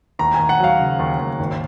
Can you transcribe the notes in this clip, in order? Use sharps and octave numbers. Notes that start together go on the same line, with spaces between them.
D#2 A#5
D#2 G#5
F#5
F#3 F5
C#3
D#2
D#2
G#1